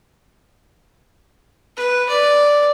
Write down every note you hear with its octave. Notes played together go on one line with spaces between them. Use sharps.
B4
D5